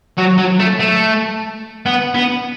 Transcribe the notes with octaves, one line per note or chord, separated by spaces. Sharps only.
F#3
F#3
A3
A3
B3
B3